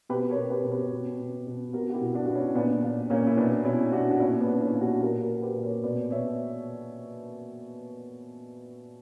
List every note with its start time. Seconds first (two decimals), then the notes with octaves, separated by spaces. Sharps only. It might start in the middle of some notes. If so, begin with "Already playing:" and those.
0.09 B2 G4 B4
0.29 A#4 C#5
0.36 B2
0.50 G4 B4
0.64 B2
0.71 G4 B4
0.92 B2
1.19 B2
1.47 B2
1.73 B2 F#4 A#4
1.89 F#4
1.94 E4 G4
2.01 B2
2.14 D4 F#4
2.26 B2 F#4
2.35 C#4 E4
2.55 A#2 B3 D4
2.83 A#2
3.10 A#2 A#3 C#4
3.27 E4
3.37 B2 B3 D4
3.64 B2 C#4 E4
3.92 B2 D4 F#4
4.11 F#4
4.19 A#2 C#4 E4
4.40 B3 D4
4.47 A#2
4.53 D4
4.60 C#4 E4
4.74 A#2
4.81 D4 F#4
5.01 A#2 F#4 A#4
5.22 F#4 A#4
5.29 A#2
5.42 G4 B4
5.56 A#2
5.63 A#4 C#5
5.83 B2 B4 D5
6.10 B2 C#5 E5